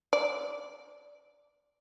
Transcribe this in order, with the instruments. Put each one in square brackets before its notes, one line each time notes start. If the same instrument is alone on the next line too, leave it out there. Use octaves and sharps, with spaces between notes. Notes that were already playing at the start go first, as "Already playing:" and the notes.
[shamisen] D5